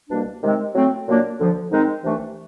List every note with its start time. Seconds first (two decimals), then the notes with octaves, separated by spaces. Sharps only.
0.10 C2 B2 G3 A#3 D4
0.42 C3 D#3 G#3 C4
0.74 A2 F#3 A3 C4
1.07 A#2 F#3 A#3 D4
1.38 D2 D3 F3
1.71 G#2 D#3 G#3 C4 D#4
2.03 C2 C3 E3 A3 D4